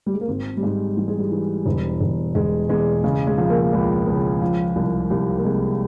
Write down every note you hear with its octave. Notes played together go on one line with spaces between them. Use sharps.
G3
G#3
A#3
G#1 C4
G3
G#2 G#3
E3 G3
G#3
G3
E3
E1
E1
E1 G#3
E2 G#3
C#3 G#3
G#3
F3
A#3
C#2
C#2
F3
C2
C2 G3
A#3
C3 G#3